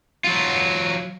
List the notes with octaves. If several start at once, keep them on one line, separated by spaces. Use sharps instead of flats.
F#3 F4